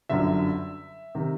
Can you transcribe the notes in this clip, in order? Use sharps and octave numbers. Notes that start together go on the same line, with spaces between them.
G1 F#2 D3 E5
C3 D#3